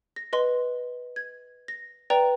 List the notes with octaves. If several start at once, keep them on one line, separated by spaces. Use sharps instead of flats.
A#6
B4 D#5 C6
G#6
A#6
B4 D5 G5 A#5